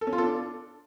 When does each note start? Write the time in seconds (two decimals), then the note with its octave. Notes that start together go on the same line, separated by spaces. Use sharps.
0.01 A4
0.07 C#4
0.13 F4
0.18 A4
0.24 D4